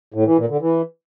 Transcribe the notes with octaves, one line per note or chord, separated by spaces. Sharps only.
A2
E3
A#2
D3
E3